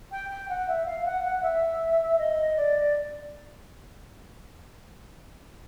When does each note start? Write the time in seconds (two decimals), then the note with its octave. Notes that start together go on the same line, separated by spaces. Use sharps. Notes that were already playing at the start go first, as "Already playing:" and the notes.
0.11 G5
0.29 G5
0.49 F#5
0.68 E5
0.86 F5
1.05 F#5
1.24 F#5
1.42 E5
2.18 D#5
2.56 D5